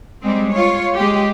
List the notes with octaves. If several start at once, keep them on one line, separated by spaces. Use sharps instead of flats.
G3 G#3 C4
F4 C#5
G#3 G4